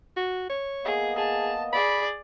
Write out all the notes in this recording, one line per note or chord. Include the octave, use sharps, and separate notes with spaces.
F#4
C#5
A#3 B3 G#4 D#5
G#4 A5
G#4 D5 B5